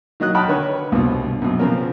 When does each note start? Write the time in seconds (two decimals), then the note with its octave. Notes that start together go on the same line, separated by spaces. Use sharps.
0.20 D#3 F#3 D#5 D#6 F#6
0.34 D#5 F#5 G5 A5 B5 F6
0.48 D3 B4 C#5
0.92 C2 G2 B2
1.42 F#2 B2
1.59 C#3 F3 B3 C4 A#4